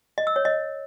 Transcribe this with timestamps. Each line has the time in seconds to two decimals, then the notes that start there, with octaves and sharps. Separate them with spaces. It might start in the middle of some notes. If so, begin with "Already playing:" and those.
0.18 D#5
0.27 E6
0.36 C#5
0.45 D#5